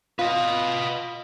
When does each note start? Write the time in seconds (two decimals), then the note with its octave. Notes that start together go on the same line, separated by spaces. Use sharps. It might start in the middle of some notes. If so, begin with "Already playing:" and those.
0.19 F4 B4 D#5